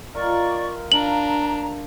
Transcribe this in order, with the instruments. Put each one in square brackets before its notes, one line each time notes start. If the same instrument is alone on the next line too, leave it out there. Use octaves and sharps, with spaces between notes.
[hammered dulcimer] D#3 F4 A#4 [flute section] D5 C#6
[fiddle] D4 [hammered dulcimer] F5 A5 [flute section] A#5 [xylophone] F#7